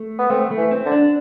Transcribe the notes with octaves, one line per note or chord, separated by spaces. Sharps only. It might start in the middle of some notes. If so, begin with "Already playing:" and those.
Already playing: A3
B3
A3 C4
A3
E3
C4
D3
D4